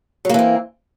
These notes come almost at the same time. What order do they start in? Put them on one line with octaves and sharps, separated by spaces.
F#3 A#3 E3 C4